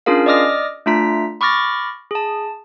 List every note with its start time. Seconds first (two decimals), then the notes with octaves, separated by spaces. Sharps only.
0.06 C#4 D4 F4 G#4 A#4 F5
0.26 D5 D#5 D6 D#6 F6 A#6
0.86 A3 D4 F4 A#5 B6
1.41 B5 C#6 D6 F6 A6 A#6
2.11 G#4 A5